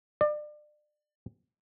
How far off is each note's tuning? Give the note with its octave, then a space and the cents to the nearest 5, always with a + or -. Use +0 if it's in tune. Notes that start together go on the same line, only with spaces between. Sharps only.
D5 +30